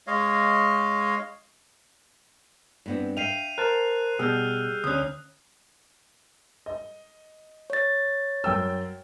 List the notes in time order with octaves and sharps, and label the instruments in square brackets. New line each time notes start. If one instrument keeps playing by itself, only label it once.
[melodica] G#3 C#5 D#5 F5
[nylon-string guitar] G2 B3 C4
[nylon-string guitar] E5 F5 G5 [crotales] C7 D#7 F7
[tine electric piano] A#4 C5 A5 [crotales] F#6
[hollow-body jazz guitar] B2 [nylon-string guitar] G3 [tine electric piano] G#4 [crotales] E6 F6 G6
[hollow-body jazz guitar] D2 C#4 [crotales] D#6 F#6
[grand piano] D#5
[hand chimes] C#5 A6
[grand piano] F#2 G5 E6